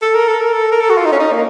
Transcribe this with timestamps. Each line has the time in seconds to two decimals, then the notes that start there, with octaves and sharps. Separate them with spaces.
0.02 A4
0.15 A#4
0.28 A4
0.41 A#4
0.53 A4
0.72 A#4
0.80 A4
0.90 F#4
0.98 F4
1.05 D#4
1.12 C#4
1.20 D#4
1.32 A#3